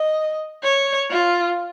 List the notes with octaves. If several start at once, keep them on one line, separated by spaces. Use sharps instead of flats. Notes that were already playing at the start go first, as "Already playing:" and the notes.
Already playing: D#5
C#5
F4